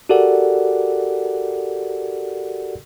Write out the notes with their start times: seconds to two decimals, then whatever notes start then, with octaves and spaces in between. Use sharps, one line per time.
0.09 F#4 G4 A4 A#4 D5 F#5